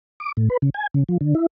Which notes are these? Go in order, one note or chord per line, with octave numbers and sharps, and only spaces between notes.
D6
A2
B4
C#3
G#5
C#3
F3
D3
E4